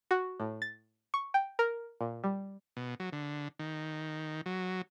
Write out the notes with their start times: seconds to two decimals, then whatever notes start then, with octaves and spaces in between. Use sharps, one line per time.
0.11 F#4
0.40 A2
0.62 A6
1.14 C#6
1.34 G5
1.59 A#4
2.01 A#2
2.24 G3
2.77 B2
3.00 F#3
3.13 D3
3.59 D#3
4.46 F#3